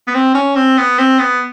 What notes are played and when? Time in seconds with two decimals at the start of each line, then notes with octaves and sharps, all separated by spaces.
0.07 B3
0.14 C4
0.35 C#4
0.56 C4
0.78 B3
0.98 C4
1.19 B3